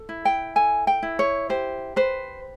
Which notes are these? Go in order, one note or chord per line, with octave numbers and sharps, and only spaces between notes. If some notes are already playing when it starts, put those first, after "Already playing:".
Already playing: A4
E4
G5
A4 G#5
G5
E4
C#5
G4 C5
B4 C5